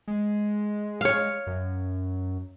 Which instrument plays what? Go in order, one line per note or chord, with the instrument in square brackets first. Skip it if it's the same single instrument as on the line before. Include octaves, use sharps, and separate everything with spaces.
[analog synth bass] G#3
[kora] C#5 F5
[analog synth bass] F#2